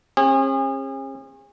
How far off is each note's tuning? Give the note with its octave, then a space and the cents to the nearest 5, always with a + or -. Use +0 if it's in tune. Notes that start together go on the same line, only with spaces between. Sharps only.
C#4 -45 G#4 -35